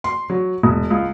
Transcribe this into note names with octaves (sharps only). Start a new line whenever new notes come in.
C6
F#3
E1
C#2